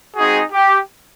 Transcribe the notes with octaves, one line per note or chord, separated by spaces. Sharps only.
G#3 C4 D#4 F#4 G#4
G4